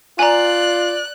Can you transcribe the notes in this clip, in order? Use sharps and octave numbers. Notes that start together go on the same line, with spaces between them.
F4 D5 G#5 A#5 F#6